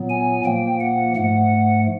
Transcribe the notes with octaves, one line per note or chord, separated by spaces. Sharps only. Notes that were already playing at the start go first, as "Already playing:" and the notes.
Already playing: A#2 F#3 B3
G#5
A#2 F3 A#3 G5
F#5
G#2 F3 A3 F#5